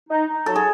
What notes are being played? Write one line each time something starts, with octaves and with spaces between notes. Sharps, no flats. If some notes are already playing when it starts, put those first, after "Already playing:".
D#4
D#4
F#3 A4
G#4